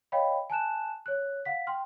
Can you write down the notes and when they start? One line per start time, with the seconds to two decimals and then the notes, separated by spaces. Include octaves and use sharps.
0.12 C#5 D#5 F5 G5 B5
0.50 G#5 A5 F#6 E7
1.06 C#5 F#6
1.45 F5 F#5 B6
1.67 G5 C6 F6